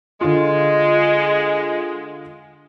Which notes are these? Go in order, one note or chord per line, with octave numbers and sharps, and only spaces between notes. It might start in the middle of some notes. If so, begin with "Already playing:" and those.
D3 G#3 F4